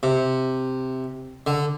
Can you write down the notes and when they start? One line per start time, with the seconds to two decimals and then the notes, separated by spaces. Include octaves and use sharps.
0.03 C3
1.47 D3